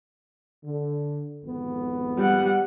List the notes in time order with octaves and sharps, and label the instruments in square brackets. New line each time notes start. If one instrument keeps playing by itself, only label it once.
[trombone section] D3
G#1 F2 B3
[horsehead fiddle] G3 F#5